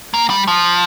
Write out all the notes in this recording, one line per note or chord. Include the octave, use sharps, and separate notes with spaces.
A#3
G3
F3